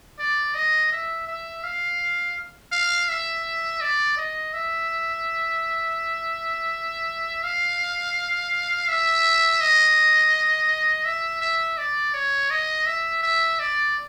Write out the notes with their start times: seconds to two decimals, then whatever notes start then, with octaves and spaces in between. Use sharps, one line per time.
0.19 D5
0.55 D#5
0.92 E5
1.27 E5
1.64 F5
2.72 F5
3.09 E5
3.81 D5
4.17 D#5
4.54 E5
7.44 F5
8.89 E5
9.61 D#5
11.05 E5
11.42 E5
11.78 D5
12.14 C#5
12.51 D#5
12.87 E5
13.23 E5
13.60 D5